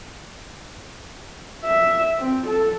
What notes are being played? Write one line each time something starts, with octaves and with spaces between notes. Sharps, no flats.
E5
C4
A4